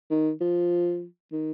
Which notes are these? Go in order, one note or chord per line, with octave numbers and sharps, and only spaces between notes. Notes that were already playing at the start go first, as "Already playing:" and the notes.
D#3
F3
D#3